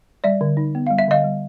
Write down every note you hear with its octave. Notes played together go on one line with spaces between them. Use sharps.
G3 D5 E5
D3
D#4
B3
G3 F5
E5
D3 D#5 F5
G3